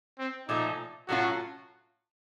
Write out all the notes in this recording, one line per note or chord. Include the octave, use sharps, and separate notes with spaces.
C4
A#2 F3 A3 D#4
A2 F#3 A3 C#4 F4 F#4